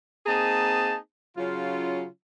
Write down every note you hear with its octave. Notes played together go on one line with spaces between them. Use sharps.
A#3 C4 D#4 G#4 A5
C#3 F#3 C#4 F4